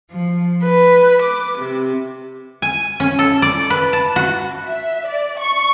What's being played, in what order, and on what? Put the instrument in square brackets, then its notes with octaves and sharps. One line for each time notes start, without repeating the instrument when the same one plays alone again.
[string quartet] F3
B4
D6
C3
[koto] G#5
C#4
A4
D5
B4
A5
F#4
[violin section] E5
D5
C#6